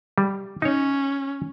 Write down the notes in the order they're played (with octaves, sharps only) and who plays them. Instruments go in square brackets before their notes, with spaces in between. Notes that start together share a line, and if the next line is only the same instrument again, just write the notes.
[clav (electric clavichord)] G3
[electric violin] C#4 [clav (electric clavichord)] D#4 C#5